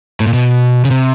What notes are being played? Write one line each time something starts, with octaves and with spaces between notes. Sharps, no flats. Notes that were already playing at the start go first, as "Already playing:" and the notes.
A2
A#2
B2
C#3
C3